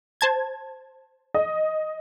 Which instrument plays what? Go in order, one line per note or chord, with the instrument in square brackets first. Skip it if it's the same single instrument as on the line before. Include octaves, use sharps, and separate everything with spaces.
[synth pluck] C5 A5 G#6
[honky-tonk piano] D#5